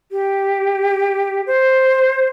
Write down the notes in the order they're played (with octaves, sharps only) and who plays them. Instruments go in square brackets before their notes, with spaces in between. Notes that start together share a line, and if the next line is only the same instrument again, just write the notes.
[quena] G4
C5